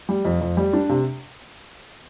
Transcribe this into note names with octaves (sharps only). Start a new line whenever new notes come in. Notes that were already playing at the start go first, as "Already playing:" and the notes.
G3
F2
F2
G3
D4
C3